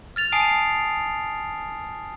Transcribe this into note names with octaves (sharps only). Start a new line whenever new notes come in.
F6 A6 F7
G#5 A5 D#6 C7 D7